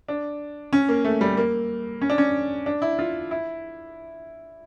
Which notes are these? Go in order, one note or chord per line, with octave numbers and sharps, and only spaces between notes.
D4
C#4
A#3
A3
G3
A#3
C#4
D4
C#4
D4
E4
F4
E4